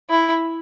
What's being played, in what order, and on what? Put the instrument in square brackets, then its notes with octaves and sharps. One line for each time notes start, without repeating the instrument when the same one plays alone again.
[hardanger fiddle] E4